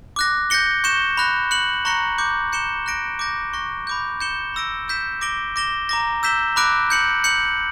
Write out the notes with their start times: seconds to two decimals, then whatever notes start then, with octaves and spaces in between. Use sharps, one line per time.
0.16 D6 F#6 A#6
0.50 G6 A#6 C#7 G7
0.84 C#6 G6 C#7 E7 G7
1.17 B5 F#6 A#6
1.51 F#6 C#7 F#7
1.85 A#5 C#6 F#6 A#6 C#7
2.18 D6 G6 C#7
2.52 G6 C#7 E7 G7
2.86 F#6 A#6 D7
3.19 D6 G6 A#6
3.53 C#6 F#6 A#6
3.87 B5 D6 G6
4.20 G6 C#7 E7 G7
4.54 B5 E6 A#6 D7
4.88 E6 G6 B6 E7
5.21 D6 A#6 D7 G7
5.56 D6 A#6 E7 G7
5.89 A#5 D6 A#6
6.23 E6 G6 B6 E7 G7
6.56 B5 D6 F#6 A#6 D7
6.90 G6 C#7 F#7
7.24 G6 C#7 F#7